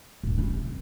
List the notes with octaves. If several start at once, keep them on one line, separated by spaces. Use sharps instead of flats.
D1
C#4 E4
C3
F1